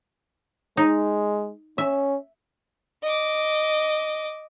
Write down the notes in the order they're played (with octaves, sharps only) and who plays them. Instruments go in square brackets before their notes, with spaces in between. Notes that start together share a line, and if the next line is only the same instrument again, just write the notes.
[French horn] G#3 [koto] D#4
[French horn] C#4 [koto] E5
[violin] D#5 D6